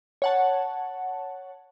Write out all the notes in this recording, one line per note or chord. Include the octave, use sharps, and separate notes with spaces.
C#5 F#5 A5